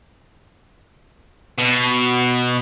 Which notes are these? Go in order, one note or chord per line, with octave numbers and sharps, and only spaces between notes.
B2